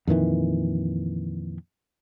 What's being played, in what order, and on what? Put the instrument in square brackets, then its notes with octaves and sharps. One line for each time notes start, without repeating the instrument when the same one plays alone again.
[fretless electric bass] F2 A#2 D#3 E3